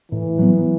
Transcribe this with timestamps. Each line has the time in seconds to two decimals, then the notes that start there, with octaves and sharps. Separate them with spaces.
0.12 A2 E3
0.39 F#3 B3